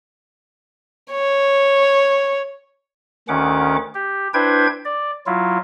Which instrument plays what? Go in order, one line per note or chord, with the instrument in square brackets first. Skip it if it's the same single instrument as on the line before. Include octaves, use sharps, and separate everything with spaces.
[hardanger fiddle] C#5
[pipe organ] D2 D#3 C#4 F#5 D6
G4
D4 E4 B4 C5 G5 G#6
D5
F#3 E4 F4